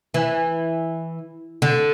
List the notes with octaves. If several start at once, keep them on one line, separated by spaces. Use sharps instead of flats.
E3
D3